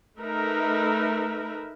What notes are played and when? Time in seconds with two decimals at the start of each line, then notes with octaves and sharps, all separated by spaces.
0.18 A3 D#4 A#4 B4 E5